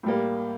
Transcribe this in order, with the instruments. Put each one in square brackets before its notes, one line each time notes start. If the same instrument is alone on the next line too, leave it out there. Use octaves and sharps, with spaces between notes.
[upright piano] A2 G3 A#3